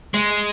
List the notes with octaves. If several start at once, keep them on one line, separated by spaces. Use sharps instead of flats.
G#3